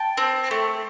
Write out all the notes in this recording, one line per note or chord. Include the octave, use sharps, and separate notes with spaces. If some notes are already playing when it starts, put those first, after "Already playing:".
Already playing: G5 A5
C4
A3